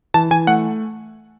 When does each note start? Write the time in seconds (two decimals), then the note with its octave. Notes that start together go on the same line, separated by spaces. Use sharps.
0.14 E3 A5
0.31 E3 G#5
0.47 A3 F#5